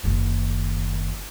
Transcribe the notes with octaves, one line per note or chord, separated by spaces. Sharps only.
F#1 D#3